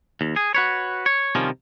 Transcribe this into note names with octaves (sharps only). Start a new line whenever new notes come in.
D#2
G#4
F#4 B4 C#5
C#5
C3 D#3 F3 G3 C#4